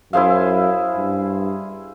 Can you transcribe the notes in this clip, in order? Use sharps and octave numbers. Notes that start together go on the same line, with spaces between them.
F#2 E4 G#4 C5 F5
G2